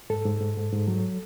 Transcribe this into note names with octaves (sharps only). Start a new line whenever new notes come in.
G#2 A4
G#2
G#2
G#2
G#2
F#3